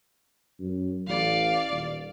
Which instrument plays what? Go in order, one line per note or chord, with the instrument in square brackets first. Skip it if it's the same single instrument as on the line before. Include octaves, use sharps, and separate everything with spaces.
[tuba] F#2
[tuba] A1 [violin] D5 F5
[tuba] D#1